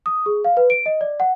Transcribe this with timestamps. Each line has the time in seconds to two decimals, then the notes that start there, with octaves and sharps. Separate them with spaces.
0.06 D#6
0.26 G#4
0.45 F5
0.57 B4
0.70 D7
0.86 D#5
1.01 D5
1.20 F#5